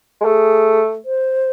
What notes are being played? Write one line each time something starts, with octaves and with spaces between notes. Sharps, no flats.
G#3
A3 G#4
C5